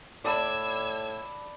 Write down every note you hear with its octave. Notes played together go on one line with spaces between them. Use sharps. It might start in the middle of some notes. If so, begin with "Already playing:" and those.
A2 D5 A5 B5 E6 G#6